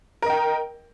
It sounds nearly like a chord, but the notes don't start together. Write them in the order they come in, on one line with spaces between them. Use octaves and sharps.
A#4 D#5 G5